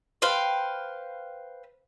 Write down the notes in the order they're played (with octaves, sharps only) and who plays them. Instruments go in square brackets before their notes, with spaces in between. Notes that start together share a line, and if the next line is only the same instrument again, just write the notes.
[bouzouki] B4 C5 F5 G5